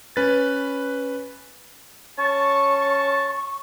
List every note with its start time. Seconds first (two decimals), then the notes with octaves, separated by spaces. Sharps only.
0.16 C#4 B4 A6
2.18 C#4 A5 C#6